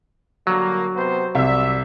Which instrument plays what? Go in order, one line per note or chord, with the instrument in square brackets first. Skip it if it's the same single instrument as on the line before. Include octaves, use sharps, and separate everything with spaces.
[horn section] D3 G3 A#3 [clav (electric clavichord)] F#3
[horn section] C3 B3 C5
[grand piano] C2 [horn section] D5 E5